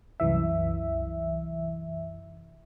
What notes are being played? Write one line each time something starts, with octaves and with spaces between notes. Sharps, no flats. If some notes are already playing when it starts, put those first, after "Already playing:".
C2 F#2 E3 E5